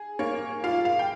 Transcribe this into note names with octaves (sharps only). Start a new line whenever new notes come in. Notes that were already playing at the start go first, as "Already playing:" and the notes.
Already playing: G#4
A#3 C#5
F4 F5
F5
G5